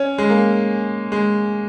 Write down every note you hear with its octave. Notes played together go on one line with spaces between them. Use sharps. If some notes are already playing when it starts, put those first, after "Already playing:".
Already playing: C#4
G#3
A#3
G#3